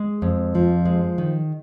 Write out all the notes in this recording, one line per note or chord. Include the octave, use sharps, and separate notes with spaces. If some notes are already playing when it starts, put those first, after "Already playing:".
Already playing: G#3
F2
F3
G#3
D#3